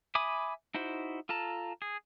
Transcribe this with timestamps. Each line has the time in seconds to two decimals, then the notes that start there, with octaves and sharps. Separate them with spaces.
0.15 E5 G#5 B5 D6 D#6
0.74 D#4 E4 F#4 C5
1.29 F4 A4 A5 A#5
1.82 G#4